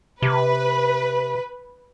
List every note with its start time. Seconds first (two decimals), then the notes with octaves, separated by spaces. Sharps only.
0.22 C3 B4